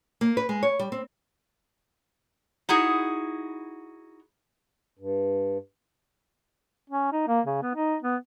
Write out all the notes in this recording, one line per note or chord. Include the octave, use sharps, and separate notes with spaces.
A#3
B4
G#3
C#5
G3
C4
D#4 E4 F#4 G#4
G2
C#4
D#4
A#3
C#3
B3
D#4
B3